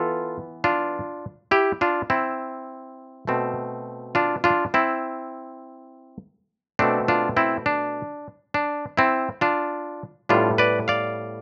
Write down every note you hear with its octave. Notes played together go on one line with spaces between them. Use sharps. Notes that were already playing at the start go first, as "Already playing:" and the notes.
Already playing: E3 B3 F4 A4
D4 F4
E4 G4
D4 F4
C4 E4
B2 A3 C4
D4 F4
D4 F4
C4 E4
B2 A3 C4 D4
D4 F4
C4 E4
D4
D4
C4 E4
D4 F4
A2 G3 B3 D4 F4
B4 D5
D5 F5